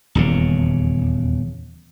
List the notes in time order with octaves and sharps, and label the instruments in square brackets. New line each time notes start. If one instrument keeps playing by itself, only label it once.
[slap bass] D#1 E2 C#3